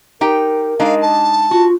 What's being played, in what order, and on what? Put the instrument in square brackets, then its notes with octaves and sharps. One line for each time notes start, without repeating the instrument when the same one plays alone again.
[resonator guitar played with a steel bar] D#4 G4 G5 [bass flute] A#4
[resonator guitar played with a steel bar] G#3 D4 D#4 [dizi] F5
[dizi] A5
[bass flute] F4 [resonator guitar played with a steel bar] F#4